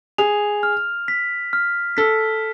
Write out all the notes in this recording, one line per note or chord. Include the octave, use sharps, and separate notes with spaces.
G#4 F7
F6
B6
F6
A4 B6